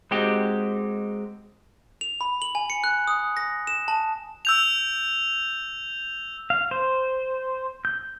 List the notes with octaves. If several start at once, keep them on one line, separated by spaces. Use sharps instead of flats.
G#3 C4 D#4 F#4 G4
F7
B5
F#7
G#5
C#7
F#6
D#6
A#6
E7
A5
E6 G6 F7
F5
C5
G6